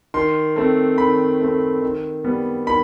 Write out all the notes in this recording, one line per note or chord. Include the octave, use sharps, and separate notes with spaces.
D#3 C6
A3 C4
D#3 B5
A3 C4
D#3
G3 B3
D#3 B5